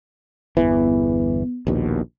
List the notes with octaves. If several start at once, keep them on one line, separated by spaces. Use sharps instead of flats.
G1 E2 E3 B3
A#1 D#2 B2